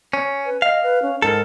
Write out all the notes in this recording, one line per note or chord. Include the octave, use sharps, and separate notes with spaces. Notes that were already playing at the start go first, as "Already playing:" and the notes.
C#4
B4
D#5 F5
B4
C#4
G#2 A4 A#4